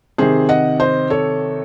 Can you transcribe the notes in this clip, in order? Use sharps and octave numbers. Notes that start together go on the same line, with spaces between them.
C3 D#3 G#4 C5
D#5 F#5
C5 D#5
A4 C#5